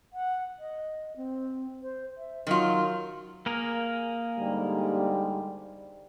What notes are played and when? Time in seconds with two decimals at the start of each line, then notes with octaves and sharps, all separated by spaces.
0.13 F#5
0.59 D#5
1.17 C4
1.82 C5
2.17 E5
2.47 D#3 F#3 F4
3.46 A#3 G#4 A#4
4.38 G#2 D3 G3